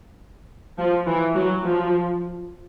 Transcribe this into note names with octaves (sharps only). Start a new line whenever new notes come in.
F3
E3
F#3
F3